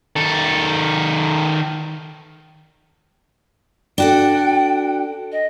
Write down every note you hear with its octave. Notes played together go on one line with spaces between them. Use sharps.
D#3 A4
D4 F#4 A4 G5
D#5